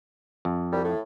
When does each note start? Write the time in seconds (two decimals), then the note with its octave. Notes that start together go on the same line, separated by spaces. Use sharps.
0.45 F2
0.72 C2 G3
0.84 A2